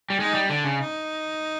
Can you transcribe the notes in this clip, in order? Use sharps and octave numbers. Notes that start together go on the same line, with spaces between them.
G3
G#3 D#4
G3
D3 D4
C#3
D#4